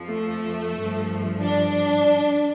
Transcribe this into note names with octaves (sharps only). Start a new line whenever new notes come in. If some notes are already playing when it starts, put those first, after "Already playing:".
Already playing: F2 F3
A3
G2 F3
D4